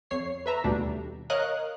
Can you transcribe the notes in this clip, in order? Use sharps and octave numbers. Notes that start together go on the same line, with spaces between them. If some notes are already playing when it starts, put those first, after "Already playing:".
F2 C#5 C7
B4 E5 A#5
D#2 B2 G3 A3 D4
A#4 C#5 D#5 F5 F#6